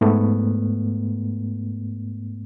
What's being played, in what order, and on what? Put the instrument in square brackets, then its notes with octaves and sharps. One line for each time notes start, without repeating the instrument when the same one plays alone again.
[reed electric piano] G#2 A3 B3